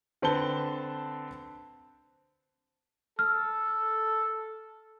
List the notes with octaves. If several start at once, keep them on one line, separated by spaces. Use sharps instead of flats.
D3 C4 B4 A5 G7
A4 F6